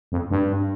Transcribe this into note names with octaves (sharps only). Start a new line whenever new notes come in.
F2
G2